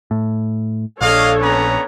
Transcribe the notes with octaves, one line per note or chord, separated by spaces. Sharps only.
A2
A#1 D4 A4 C#5 D#5 F5
B3 C#4 A#5